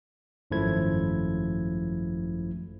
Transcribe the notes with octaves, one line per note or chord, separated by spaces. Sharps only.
G#1 F#2 F3 A3 E4 G#6